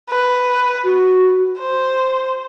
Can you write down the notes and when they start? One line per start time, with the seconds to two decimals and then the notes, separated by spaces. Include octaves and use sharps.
0.10 B4
0.84 F#4
1.59 C5